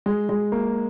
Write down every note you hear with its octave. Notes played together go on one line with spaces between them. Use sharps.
G#3
G#3
A#3